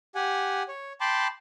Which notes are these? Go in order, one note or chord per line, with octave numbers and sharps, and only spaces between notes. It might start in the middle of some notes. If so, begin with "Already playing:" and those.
G4 F#5 G#5
C#5
G5 A5 B5 C6 D6